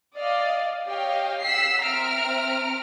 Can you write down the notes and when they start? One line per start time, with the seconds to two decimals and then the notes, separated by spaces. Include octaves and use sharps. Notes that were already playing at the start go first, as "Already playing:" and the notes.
0.15 D5 D#5 F5
0.87 G4 C#5 D#5 F5 G5
1.42 F#5 E6 B6 C7
1.84 C4 E5 A#5 F6 D7